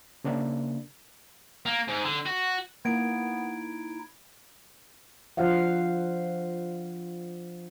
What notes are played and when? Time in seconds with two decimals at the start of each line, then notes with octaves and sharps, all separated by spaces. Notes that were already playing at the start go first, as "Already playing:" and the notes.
0.24 C#3 A#3 D4
1.66 A#3
1.88 G#2
2.04 D3
2.26 F#4
2.85 A#3 B3 D#4 E4 G#6 D7
5.37 F3 D4 F4 C5 F5 F#5